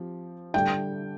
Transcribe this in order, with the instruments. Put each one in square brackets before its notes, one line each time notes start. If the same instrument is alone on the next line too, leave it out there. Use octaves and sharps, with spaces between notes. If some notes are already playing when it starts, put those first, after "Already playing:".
Already playing: [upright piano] F3 C4 G4
[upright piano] D3 G3 D4 [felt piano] G5